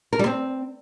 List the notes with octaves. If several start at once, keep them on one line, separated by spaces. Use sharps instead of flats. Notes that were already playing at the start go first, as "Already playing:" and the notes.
A#4
G3
C4